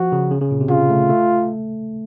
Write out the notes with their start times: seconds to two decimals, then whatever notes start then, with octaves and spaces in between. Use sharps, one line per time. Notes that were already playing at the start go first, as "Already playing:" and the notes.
Already playing: F3 F#4
0.12 C#3
0.31 C#3
0.42 C#3
0.51 A#2
0.61 C3
0.70 C#3 F4
0.90 A3
1.10 A3